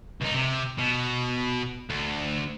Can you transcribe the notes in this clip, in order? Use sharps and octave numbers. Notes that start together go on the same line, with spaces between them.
C#2 D#4
C3
B2
D2